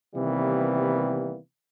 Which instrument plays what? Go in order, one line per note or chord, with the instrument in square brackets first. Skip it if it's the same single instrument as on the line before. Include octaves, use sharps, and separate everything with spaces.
[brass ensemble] C3 D#3 E3 G3 A#3 B3